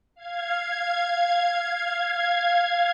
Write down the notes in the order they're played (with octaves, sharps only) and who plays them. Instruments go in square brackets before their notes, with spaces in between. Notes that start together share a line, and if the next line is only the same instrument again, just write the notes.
[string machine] F5 G#6